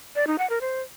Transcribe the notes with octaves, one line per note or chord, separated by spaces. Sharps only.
D5
D#4
F#5
A#4
C5